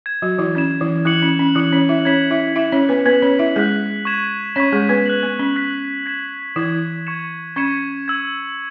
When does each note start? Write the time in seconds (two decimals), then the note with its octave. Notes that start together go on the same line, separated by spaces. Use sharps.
0.06 G#6 E7
0.22 F#3 F#4
0.38 E3 E4
0.55 C#4 G#6 E7
0.81 E3 E4
1.05 E3 E4 F#6 C#7 F#7
1.23 C#4
1.39 C#4
1.55 E3 E4 F#6 C#7 F#7
1.72 C#4 C#5
1.89 E4 E5
2.05 C#4 C#5 G#6 B6 E7
2.31 E4 E5
2.55 E4 E5 G#6 B6 E7
2.72 C#4 C#5
2.89 B3 B4
3.06 B3 B4 F#6 B6 F#7
3.22 C#4 C#5
3.39 E4 E5
3.56 G#3 G#4 F#6 B6 F#7
4.05 C#6 G#6 B6 E7
4.55 C#4 C#5 C#6 G#6 B6 E7
4.72 G#3 G#4
4.89 B3 B4
5.06 F#6 B6 F#7
5.23 B3
5.39 C#4
5.56 F#6 B6 F#7
6.06 G#6 B6 E7
6.56 E3 E4 G#6 B6 E7
7.07 C#6 G#6 C#7 E7
7.56 C#4 C#6 G#6 C#7 E7
8.06 E6 G#6 E7